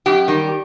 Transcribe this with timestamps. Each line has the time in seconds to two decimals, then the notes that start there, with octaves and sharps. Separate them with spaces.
0.06 F#2 G4
0.28 D#3 G3